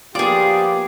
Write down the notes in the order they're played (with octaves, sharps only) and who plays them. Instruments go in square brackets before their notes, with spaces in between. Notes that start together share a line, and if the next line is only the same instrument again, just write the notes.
[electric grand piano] F3 A#3 B3 [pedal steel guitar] F4 D5 [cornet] G4 [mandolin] G#4 D6